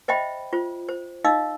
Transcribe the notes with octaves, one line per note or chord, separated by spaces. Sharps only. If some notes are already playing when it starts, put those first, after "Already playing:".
C5 D#5 E5 G5 B5
F4 C5
C5
D#4 D#5 F5 E6